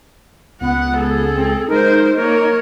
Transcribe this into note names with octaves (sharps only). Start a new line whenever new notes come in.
C#2 B3 F#5
G#4 A4
C4
G#3 D#4 A#4 C5
A#3 A#4 C#5